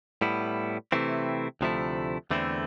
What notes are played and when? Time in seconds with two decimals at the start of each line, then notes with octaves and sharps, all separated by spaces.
0.21 A2 G3 B3 E4
0.92 C3 E3 A3 C4 E4
1.61 D2 C3 F3 A3 E4
2.30 E2 D3 A3 C4 E4